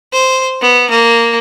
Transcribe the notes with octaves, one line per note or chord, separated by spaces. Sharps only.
C5
B3
A#3